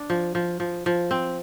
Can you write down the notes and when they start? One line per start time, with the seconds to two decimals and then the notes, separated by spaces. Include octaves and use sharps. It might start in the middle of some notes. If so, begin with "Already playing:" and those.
Already playing: D4
0.10 F3
0.35 F3
0.60 F3
0.86 F3
1.11 C4